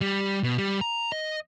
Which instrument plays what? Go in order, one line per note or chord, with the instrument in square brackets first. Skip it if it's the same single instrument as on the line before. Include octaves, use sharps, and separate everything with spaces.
[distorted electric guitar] G3
B2
G3
A#5
D#5